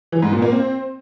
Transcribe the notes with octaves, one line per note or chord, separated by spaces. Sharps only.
E3
G#2
A#2
A#3
C4